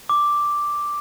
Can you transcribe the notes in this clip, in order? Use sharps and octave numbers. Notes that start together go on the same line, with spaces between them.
D6